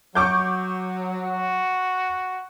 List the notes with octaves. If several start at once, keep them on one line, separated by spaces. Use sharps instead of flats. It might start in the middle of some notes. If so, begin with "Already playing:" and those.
F#3 C#6 D6 G6
F#4